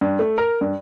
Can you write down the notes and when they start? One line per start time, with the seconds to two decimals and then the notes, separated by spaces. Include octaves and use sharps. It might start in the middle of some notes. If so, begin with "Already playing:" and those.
0.01 G2
0.19 A3
0.38 A#4
0.61 G2